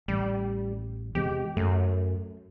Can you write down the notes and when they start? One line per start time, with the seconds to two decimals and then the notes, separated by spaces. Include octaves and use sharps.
0.08 A1 G3
1.15 E2 C3 G#3 G4
1.57 F#2 A3